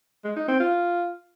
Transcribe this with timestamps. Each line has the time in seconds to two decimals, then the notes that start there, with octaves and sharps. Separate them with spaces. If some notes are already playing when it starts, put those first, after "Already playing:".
0.24 G#3
0.36 D#4
0.48 C4
0.60 F4